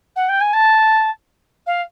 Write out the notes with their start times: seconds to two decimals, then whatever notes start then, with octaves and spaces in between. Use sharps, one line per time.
0.16 F#5
0.29 G5
0.40 G#5
0.53 A5
1.66 F5